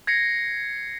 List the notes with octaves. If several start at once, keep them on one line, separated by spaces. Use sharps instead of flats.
G#6 A#6 C7 C#7